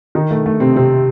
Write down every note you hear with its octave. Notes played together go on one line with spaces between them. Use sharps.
D#3 D#4
A3
A3
C3 C4
C3 C4